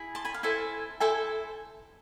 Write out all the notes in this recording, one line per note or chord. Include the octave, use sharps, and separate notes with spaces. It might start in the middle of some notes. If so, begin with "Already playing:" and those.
Already playing: E4 G#4
A5 C6
G#5 B5
F5
E4 A4 C5 E5 G#5
E4 A4 C5 E5 G#5